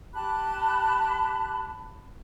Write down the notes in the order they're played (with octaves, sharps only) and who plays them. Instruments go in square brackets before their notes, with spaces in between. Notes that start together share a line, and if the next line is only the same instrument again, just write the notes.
[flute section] G4 A5 B5 F#6